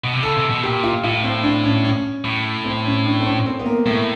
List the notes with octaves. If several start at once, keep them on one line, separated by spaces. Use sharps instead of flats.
B2
C3
C#3 A4
C3
B2
A#2 G4
F4
A2 F4
C4
D4
C#4
C#4
A2
C4
C#4
D4
C4
C#4
C4
B3
A#3
A2 A3